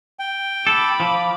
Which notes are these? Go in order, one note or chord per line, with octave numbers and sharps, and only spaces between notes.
G5
A4 B5 D6
F3